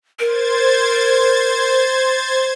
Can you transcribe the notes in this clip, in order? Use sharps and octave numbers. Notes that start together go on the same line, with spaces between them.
A#4 C5 G#6 A6